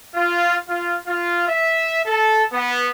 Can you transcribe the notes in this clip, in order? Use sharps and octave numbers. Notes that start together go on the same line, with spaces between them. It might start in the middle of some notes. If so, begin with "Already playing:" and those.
F4
F4
F4
E5
A4
B3